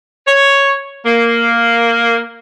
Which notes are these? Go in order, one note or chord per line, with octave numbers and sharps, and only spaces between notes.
C#5
A#3